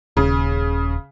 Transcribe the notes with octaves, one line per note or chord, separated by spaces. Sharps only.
D#1 C#3